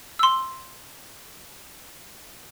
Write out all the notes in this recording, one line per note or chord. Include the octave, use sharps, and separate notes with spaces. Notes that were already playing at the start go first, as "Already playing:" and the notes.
C6 E6